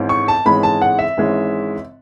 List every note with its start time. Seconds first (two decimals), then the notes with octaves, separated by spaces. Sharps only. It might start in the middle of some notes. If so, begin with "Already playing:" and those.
Already playing: G#1 G#2 E3 G#3 C#4
0.09 C#6
0.28 A5
0.45 G#1 G#2 E3 G#3 C#4 B5
0.63 A5
0.82 F#5
0.99 E5
1.17 G#1 G#2 E3 G#3 C#4